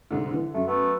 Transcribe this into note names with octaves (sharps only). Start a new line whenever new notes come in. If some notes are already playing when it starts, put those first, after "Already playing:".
C2 G#2 D3
D3 E3
F#2 A3
A3 B3